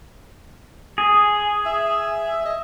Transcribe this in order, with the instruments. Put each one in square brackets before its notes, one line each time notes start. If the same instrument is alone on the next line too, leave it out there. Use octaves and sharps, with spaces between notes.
[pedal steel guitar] G#4
[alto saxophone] E5
D#5